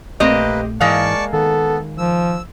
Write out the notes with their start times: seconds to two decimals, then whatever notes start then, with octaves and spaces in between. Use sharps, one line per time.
0.20 A#1 A3 A#3 C4 G4 B4 D#5
0.81 G#2 E3 G#3 A#3 D5 F5 A5 C#6
1.33 D#3 B3 A4
1.98 F3 E6